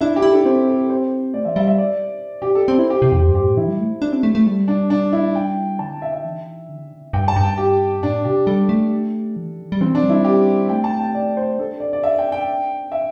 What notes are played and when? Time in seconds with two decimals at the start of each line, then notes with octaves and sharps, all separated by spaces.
0.01 D4 E4
0.16 G4
0.22 E4
0.31 D4 A4
0.45 C4 C5
0.68 A4
0.90 C5
1.34 A3 D5
1.45 E3 E5
1.56 G3 E5
1.67 E5
1.78 D5
2.42 G4
2.55 A4
2.68 C4 C5
2.79 E4
2.90 G4
3.02 C3
3.12 E2 G4
3.28 G2
3.35 G4
3.43 A2
3.57 E3 E4
3.68 G3
3.80 A3
4.02 D4
4.13 C4
4.23 A3
4.35 A3
4.47 G3
4.68 D4
4.90 D4
5.13 E4
5.35 G5
5.79 D3 A5
6.02 E5
6.13 E5
6.25 E3
6.69 D3
7.13 G2 G5
7.28 A5
7.36 G2
7.44 G5
7.58 G4
8.02 A2 D4
8.25 C3 G4
8.46 G3 A4
8.69 A3
9.36 E3
9.72 G3
9.81 E3 C4
9.95 D4
10.03 G3
10.10 E4
10.24 G4
10.69 A3 G5
10.84 A5
11.00 G5
11.15 D5
11.37 C5
11.59 D4 A4
11.80 D5
11.93 D5
12.03 E5
12.19 G5
12.32 G5
12.92 E5